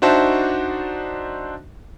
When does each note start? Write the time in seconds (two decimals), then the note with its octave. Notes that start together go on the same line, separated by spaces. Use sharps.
0.02 D4 D#4 F#4 C5 E5 A5